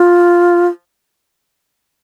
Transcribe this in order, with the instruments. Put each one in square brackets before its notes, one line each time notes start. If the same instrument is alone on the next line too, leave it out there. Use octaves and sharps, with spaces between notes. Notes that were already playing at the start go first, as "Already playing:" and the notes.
Already playing: [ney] F4